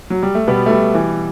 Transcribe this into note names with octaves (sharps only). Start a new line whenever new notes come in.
F#3
G3
A3
B2 G3 B3
A3
B2 G3
E3